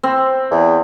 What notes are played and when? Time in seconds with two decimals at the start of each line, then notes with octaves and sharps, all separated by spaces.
0.03 C4
0.51 E2